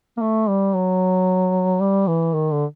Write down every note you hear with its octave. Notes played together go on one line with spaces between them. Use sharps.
A#3
A3
G3
F#3
G3
E3
D#3
D3